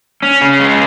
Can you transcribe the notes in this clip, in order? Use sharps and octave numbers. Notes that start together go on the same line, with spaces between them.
C#4
C#3
G#3